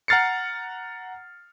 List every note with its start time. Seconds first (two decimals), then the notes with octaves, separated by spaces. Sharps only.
0.08 F#5 A#5 F6 A6 C7 C#7